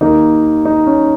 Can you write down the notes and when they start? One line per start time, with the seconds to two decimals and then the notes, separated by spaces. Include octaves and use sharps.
0.01 D#2 D#3 A#3 D#4
0.65 D#4
0.87 C#4